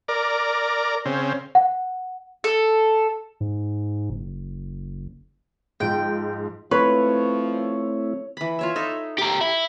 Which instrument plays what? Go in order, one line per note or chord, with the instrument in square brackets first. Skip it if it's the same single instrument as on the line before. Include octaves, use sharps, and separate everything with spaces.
[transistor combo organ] A#4 D5
C#3 C4
[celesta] F#5
[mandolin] A4
[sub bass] G#2
F#1
[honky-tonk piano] G#2 F3 [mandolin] G5
[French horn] F3 [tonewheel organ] A3 C4 E4 [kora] B4 [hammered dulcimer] C#5
[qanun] E3 B5
F4 C#5 E5
D#4 A4 E5
[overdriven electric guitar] G4 A#4 [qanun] D6
[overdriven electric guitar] E4